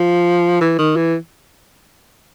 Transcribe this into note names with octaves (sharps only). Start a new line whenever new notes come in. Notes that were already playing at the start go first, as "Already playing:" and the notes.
Already playing: F3
E3
D#3
E3